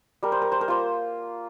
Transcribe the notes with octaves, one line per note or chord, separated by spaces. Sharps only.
G3 A#4
C5
A#4
C5
A#4
A#3 F4 C5